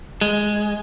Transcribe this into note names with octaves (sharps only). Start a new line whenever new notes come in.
G#3